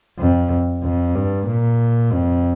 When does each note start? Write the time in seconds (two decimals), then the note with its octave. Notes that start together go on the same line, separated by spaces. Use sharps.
0.19 F2
0.83 F2
1.15 G2
1.47 A#2
2.12 F2